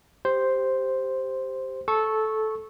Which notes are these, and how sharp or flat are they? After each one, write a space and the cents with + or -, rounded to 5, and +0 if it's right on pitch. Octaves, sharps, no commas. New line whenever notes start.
G4 +0 C5 +0
A4 -15 C#6 -10